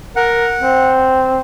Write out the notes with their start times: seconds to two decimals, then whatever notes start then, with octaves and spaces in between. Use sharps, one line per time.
0.16 A#4 F#5
0.62 C4